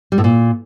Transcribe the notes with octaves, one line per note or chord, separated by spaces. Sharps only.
G3
A2
A#2